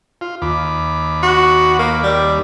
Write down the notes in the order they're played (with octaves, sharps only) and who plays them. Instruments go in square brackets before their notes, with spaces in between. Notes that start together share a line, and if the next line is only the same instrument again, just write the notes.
[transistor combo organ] F4
D#2 B5 D6
[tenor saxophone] F#4
A#3
G3